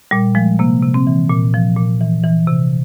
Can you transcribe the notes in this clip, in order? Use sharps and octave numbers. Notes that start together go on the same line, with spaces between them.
A#2 G3
F3 G#3
C3 A#3
C3
C4
E3
A#2
F3
A#2
E3
E3
C3